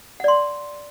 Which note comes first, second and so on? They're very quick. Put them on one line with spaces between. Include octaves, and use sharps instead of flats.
F#5 D5 C6